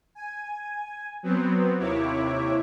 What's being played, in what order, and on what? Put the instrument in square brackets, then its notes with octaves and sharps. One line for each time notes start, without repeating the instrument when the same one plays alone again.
[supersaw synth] G#5
F#3 B3 C4
D#2 C3 E4 C#5 D6